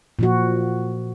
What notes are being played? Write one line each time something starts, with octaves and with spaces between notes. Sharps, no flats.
A#2 F3 F#4